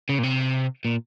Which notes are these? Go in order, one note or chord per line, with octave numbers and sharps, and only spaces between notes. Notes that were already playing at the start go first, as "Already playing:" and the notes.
C#3
A#2
C3
A#2